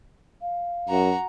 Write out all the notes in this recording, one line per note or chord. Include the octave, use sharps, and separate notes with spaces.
F5
F#2 F#4 A#5